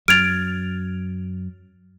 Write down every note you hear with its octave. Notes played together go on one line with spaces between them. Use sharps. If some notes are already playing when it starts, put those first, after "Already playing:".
F#2 F#3 F6 G#6 A6 D7 F7